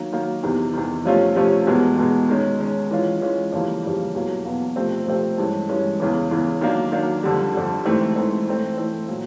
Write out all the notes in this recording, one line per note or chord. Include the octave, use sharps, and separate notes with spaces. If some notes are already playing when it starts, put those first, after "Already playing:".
Already playing: D#3 F#3 A#3
D#3 F#3 A#3
E2 C3 D#3
E2 C3 D#3
C3 F3 A3 C#4 F4
C3 F3 A3 C#4 F4
E2 B2 G#3
E2 B2 G#3
D#3 G#3 C#4
D#3 G#3 C#4
E3 G#3 C#4 F4
E3 G#3 C#4 F4
F2 C#3 E3 G3 A#3
F2 C#3 E3 G3 A#3
E2 B2 F#3 A#3
E2 B2 F#3 A#3
C3 F3 A3 C4
C3 F3 A3 C4
G2 E3 G#3 C#4
G2 E3 G#3 C#4
E2 C#3 E3
E2 C#3 E3
D#3 F#3 A#3 D4
D#3 F#3 A#3 D4
F2 D3 G3
F2 D3 G3
G#2 E3 A3 C4
G#2 E3 A3 C4
E3 A3 C4
E3 A3 C4
A#2 F#3